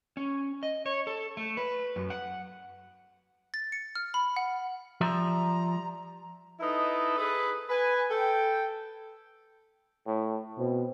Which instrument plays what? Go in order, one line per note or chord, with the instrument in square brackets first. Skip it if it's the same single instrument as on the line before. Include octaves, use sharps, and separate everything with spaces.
[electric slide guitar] C#4
D#5
C#5
A4
A3
B4
F#2
F#5
[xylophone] A6
C#7
F6
B5
F#5
[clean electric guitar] F3 G3 E5 [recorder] A#5
[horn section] D#4 E4 A4 B4 D#5
G#4 A4 B4
B4 G#5
A4 G5
[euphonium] A2
[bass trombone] B2 [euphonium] C4